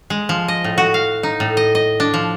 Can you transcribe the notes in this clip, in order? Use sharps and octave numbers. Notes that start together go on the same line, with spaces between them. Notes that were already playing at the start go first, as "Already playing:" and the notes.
G#3
F3
D#5
A2
F#4
F5
D#4
A2
D#5
D#5
D4
F3